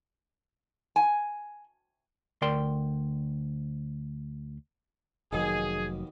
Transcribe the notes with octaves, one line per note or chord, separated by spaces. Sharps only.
G#5
D2 A#4 D5 G5 C6
F1 D#2 B2 D#3 F#3 G#4